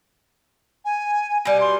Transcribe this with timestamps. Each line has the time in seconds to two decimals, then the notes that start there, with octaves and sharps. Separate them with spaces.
0.85 G#5
1.45 B2 G3 G#5
1.61 C6